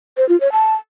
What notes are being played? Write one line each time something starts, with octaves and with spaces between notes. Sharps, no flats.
C5
F4
C#5
A5